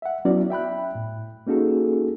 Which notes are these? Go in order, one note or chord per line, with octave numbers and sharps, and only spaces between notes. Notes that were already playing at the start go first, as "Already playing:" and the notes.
E5 F#5
F#3 B3 C#4 E4 F#4 D5
E5 G5 B5 F#6
A2
A#3 C#4 D#4 F#4 G#4 A4